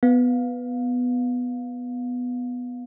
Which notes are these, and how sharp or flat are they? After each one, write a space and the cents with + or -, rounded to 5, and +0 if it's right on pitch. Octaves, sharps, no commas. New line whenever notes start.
B3 +5 F5 +20